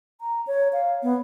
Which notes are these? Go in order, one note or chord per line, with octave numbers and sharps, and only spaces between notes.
A#5
C#5
F5
B3